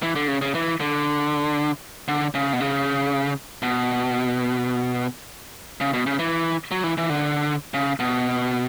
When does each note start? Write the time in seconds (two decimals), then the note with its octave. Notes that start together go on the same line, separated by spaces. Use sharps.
0.03 E3
0.16 D3
0.28 C#3
0.42 C#3
0.55 E3
0.80 D3
2.08 D3
2.35 C#3
2.53 B2
2.60 C#3
3.62 B2
5.81 C#3
5.94 B2
6.06 C#3
6.19 E3
6.71 F#3
6.84 E3
6.98 E3
7.10 D3
7.74 C#3
8.00 B2